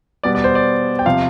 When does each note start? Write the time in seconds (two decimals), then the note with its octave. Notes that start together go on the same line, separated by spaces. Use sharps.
0.24 B2 G3 B3 D5
0.35 D5
0.44 C5
0.55 D5
0.99 G5
1.06 C3 F3 F5